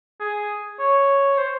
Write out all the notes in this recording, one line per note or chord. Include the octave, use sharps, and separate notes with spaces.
G#4
C#5
C5